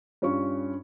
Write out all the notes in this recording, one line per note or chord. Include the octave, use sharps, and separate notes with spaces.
G2 C#4 F4 C#6